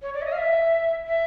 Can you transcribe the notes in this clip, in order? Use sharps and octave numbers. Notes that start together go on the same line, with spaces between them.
C#5
D5
E5
D#5
F5
E5
E5